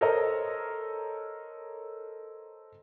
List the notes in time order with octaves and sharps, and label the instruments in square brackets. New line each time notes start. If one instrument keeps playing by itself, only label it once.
[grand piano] A4 A#4 C5 C#5 D#5 A#5